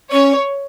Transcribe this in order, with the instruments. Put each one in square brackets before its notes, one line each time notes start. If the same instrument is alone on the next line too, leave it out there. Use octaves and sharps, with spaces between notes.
[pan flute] C#4 [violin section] C#5